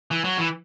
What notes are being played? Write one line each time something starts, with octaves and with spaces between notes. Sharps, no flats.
E3
F#3
E3